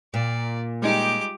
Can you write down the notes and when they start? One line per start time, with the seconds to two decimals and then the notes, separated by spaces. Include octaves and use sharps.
0.14 A#2 D5
0.82 G3 G#3 D#4 G4 D6